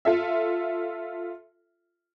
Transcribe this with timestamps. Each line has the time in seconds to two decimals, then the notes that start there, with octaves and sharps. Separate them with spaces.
0.05 F4 A4 E5